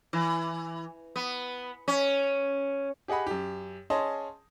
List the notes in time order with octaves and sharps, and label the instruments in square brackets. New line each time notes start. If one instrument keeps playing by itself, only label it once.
[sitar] E3
B3
C#4
[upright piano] G4 G#4 D#5 F#5 B5
F#2 G4
C#4 G#4 D#5 A5 C6